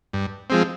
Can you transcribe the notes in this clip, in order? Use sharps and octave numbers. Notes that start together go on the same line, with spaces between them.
G2
F3 G#3 C4